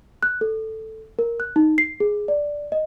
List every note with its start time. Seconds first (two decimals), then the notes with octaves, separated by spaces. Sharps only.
0.23 F#6
0.41 A4
1.19 A#4
1.40 F#6
1.56 D#4
1.78 C7
2.00 G#4
2.28 D5
2.72 D#5